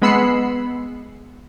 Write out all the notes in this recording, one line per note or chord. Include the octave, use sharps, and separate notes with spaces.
G#3 B3 B5 E6 C7 C#7